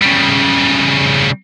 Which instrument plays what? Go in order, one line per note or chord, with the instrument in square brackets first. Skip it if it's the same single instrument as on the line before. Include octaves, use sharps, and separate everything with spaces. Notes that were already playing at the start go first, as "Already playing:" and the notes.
[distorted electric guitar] C#3 G3